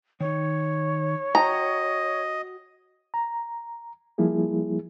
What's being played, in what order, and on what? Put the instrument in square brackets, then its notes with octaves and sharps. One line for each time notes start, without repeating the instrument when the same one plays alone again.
[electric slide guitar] D#3 D#4 [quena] C#5
[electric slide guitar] F#4 G5 [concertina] D#5 [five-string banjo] A#5
[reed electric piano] A#5
F3 G3 A#3 E4 G#4